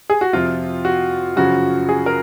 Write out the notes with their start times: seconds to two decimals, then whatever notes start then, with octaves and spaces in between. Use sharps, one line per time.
0.10 G#4
0.21 F#4
0.33 F2 C3 F3 F4
0.85 F#4
1.36 F#2 C#3 F3 F#4
1.89 G#4
2.06 A#4